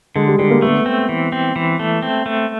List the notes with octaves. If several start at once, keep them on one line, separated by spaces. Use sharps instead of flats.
D3 G#3
G3
D3 G3
A#3
A3 B3
C4
E3
C4
E3
A3
C4
A3